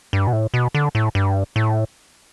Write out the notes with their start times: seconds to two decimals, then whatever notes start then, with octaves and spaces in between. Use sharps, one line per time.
0.13 G2
0.27 B2
0.33 A2
0.54 B2
0.75 D3
0.95 A2
1.15 G2
1.56 A2